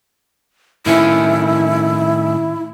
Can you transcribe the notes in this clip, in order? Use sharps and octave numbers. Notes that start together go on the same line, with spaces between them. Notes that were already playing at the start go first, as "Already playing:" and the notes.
A2 D#3 C#4 E4